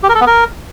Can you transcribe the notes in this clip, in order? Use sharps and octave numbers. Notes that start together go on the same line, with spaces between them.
G4
A#4
A4
B3
A#4